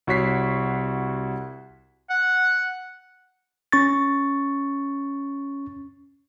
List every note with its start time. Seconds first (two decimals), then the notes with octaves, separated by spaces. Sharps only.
0.07 C2 F#4 C#5 B6 C7
2.10 F#5
3.72 C#4 C#6 A6